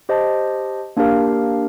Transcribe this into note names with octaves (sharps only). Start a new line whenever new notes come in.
G4 C5 D#5 A5
A#3 D4 G4 A#4 F5